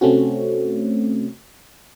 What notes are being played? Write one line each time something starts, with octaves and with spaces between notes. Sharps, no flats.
C3 A3 C4 C#4 F#4